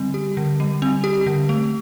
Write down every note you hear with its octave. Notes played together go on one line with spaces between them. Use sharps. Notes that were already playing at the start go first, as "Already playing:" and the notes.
Already playing: D3 G3 C4
G4
D3
G3
C4
G4
D3
A3